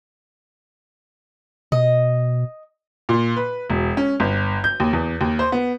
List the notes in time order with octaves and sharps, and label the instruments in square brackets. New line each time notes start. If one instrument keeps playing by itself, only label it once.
[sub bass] B2 [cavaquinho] D#5
[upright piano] A#2
B4
E1
C#4
G1
G6
D#2
E2
D#2
C5
B3